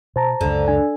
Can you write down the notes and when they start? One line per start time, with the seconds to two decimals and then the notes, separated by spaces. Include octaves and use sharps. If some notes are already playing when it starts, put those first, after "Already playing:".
0.16 B2 C5 A5 A#5
0.41 C#2 F#2 D3
0.68 D4 G#5